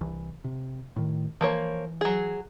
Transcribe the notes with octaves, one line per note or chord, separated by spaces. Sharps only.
C2 E3
C3
A2 D#3
E3 F3 A#3 C#5
F#3 G#4